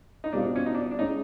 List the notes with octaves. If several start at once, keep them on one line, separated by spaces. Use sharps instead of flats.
D#4
B2 G3 C4 D4 F4
D4
C#4
D#4
D4
D4
G#3 C#4 D#4 E4 G#4